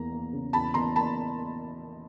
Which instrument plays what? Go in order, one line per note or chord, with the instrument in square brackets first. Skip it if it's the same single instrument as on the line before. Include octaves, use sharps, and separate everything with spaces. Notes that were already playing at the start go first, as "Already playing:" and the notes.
Already playing: [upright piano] E2 A#3 [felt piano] A#5
[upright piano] A#3
C#3
[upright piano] E2 [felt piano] A5 B5
[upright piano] E2 [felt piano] A#5 C6
[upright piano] A#3 [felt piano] A5 B5